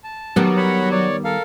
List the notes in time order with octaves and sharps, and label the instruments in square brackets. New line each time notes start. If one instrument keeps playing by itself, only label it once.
[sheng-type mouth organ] A5
[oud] D#3 G3 B3 [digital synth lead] F#3
[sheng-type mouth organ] C#5 F#5 B5
C#5 D5
A4 A#4 F5